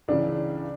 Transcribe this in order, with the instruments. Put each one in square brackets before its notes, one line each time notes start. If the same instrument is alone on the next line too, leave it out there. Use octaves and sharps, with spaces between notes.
[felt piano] C#2 C#3 E3 [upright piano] D4